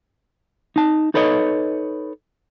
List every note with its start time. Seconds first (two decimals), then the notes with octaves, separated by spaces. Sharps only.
0.76 D#4 A5
1.14 D#4 A4 B4 C#5 D#5